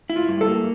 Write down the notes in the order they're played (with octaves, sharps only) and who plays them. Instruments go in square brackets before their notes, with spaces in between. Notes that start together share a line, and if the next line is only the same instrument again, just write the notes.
[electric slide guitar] E4
[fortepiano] F4
[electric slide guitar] G2
[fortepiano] A4
[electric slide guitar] A#3